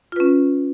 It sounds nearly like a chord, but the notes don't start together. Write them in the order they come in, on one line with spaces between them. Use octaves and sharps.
F4 B4 C#4